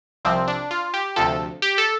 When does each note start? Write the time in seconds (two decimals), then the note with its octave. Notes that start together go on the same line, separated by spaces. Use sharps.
0.25 C2 C3 F3 C4
0.48 D4
0.71 F4
0.94 G4
1.16 D2 C3 F3 A4
1.62 G4
1.78 A4